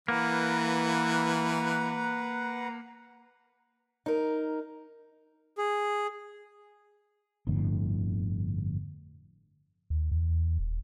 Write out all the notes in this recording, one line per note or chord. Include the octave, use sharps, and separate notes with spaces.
E3 A#3 B4 F#5 A#5
D#4 A#4
G#4
G1 F2 A2 D3
D#2
E2
D#1